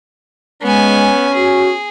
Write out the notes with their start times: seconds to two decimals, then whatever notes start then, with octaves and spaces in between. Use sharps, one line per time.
0.62 G#3 B3 C#4 G#5
1.34 F#4 G#4